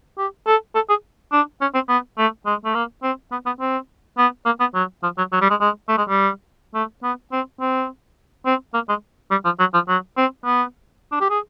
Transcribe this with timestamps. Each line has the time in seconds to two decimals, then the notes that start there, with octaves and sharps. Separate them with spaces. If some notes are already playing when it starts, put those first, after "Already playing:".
0.18 G4
0.47 A4
0.75 A4
0.89 G#4
1.32 D4
1.61 C#4
1.74 C4
1.89 B3
2.18 A3
2.46 G#3
2.65 A3
2.75 A#3
3.03 C4
3.32 B3
3.46 B3
3.60 C4
4.18 B3
4.46 A#3
4.60 B3
4.74 F#3
5.03 F3
5.18 F#3
5.32 F#3
5.41 G3
5.50 G#3
5.61 G#3
5.88 A3
5.98 G#3
6.08 G3
6.74 A3
7.03 B3
7.32 C4
7.60 C4
8.46 C4
8.74 A#3
8.89 G#3
9.31 G3
9.45 F3
9.59 F#3
9.74 F3
9.88 F#3
10.17 C4
10.45 B3
11.12 D4
11.21 G4
11.30 G#4